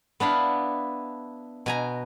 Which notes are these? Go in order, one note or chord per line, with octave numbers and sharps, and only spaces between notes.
B3 D4 E4 F5
B2 G#5 A#5